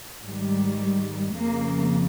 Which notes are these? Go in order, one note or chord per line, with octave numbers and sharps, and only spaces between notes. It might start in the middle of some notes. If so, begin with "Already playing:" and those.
G#2 D#3 G3
F2 C#3 A#3